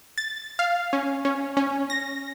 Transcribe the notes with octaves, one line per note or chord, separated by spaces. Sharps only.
A6
F5
C#4
C#4
C#4
A#6